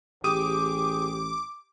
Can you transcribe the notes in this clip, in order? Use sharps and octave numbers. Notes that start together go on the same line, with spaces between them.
A1 G4 G#4 D6 D#6 D#7